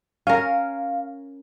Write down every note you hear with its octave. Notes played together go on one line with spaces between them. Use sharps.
C#4 A#4 F5